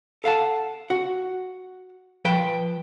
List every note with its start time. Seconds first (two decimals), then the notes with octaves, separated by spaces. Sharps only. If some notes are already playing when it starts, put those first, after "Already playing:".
0.24 A4 F5 F#5 A5
0.90 F#4 F#5
2.25 F3 B4 G5